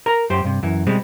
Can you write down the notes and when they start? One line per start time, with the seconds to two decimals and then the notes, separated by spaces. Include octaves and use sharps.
0.06 A#4 A#5
0.30 F#2 G4 C5
0.44 G2 C3
0.63 F#2 E3
0.87 B2 G3 G#3 C4